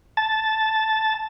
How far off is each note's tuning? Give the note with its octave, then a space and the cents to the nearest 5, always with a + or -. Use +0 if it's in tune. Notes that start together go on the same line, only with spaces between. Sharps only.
A5 -5